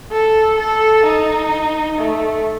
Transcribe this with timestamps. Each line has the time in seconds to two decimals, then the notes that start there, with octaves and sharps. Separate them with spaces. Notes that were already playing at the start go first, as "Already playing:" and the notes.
0.11 A4
0.58 A4
1.05 D#4
1.98 A3